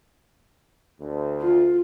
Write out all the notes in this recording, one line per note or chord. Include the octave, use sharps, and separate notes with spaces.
D2
F4